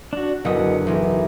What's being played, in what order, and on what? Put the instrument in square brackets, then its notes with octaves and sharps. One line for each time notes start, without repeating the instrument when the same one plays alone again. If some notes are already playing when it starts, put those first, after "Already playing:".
[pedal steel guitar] D4 F#4
[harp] F#1 [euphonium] B2 [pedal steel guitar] D3 F#5 D#6
[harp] B1 [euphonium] E3